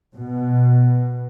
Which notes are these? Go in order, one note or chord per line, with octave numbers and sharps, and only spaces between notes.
B2